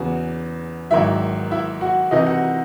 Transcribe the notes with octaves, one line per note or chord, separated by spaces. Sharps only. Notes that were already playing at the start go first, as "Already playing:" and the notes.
Already playing: E2 C#3 E3 F#4
G#1 G#2 D#3 F#3 E4 E5
E4 E5
F#4 F#5
C2 C3 E3 D#4 D#5
F#4 F#5